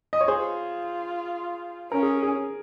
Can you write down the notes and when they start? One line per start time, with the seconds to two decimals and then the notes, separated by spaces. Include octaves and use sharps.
0.13 D#5
0.21 C#5
0.28 F4 G#4 C5
1.92 C#4 A#4
2.03 G#4
2.23 G#4